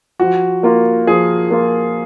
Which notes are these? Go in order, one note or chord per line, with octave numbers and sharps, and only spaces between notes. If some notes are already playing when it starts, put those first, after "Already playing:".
F3 F#4
A#3 F4
F3 G#4
A#3 F4